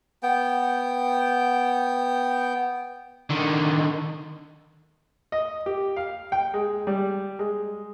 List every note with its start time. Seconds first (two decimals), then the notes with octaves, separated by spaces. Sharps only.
0.23 B3 G5
3.30 D3 D#3
5.32 D#5
5.66 G4
5.96 F5
6.32 G5
6.54 G#3
6.87 G3
7.39 G#3